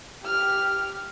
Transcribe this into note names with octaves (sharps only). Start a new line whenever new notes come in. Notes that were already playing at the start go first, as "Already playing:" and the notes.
G4 F6